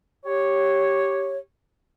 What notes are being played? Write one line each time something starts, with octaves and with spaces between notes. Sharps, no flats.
G4 C#5